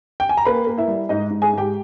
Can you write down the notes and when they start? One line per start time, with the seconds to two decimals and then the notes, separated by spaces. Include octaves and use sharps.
0.20 G5
0.29 G#5
0.37 A#5
0.45 A#3 B4 B5
0.67 A#3
0.78 E4 E5
0.88 G3
1.09 G#2 D#4 D#5
1.31 G#2
1.42 G#4 G#5
1.53 G#2 G4 G5